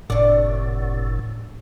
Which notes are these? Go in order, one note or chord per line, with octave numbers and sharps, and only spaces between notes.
F#1 A2 C3 D4